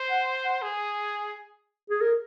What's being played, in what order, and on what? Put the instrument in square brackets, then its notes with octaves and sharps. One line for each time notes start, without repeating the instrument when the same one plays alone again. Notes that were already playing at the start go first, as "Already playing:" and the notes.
Already playing: [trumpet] C5
[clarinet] F#5
F#5
[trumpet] G#4
[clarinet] G#4
A#4